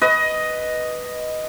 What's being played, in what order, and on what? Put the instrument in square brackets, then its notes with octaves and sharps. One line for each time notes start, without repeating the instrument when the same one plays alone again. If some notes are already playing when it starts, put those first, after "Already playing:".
[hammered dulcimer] B4 D#5